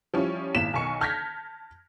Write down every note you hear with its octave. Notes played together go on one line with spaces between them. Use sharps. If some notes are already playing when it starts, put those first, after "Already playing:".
F3 G3 C#4 E4
G#1 A#2 E4 B6 E7
B1 D#3 G#5 C#6 C#7
A5 F6 G6 G#6 A#6 B6